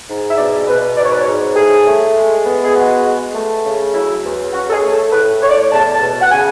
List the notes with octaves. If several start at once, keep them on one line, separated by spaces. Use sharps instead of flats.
G#2
E5
B2 D5
B2 B4
G#2 D5
C#5
B4
C#5
G#2
A2 G#4
A3
G#3
B3
G#4
G#3 F#4
G#3
A3
C#3
F#3 E4
E2
C#4 F#4
A4
G#4
A3
A4
A2 B4
A2 C#5
D5
C#5
E2 A5
A5
B2
F#5
C#3 G#5